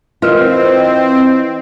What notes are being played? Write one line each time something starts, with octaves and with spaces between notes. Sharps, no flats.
E3 C4 F4 A#4 B4 D#5 F5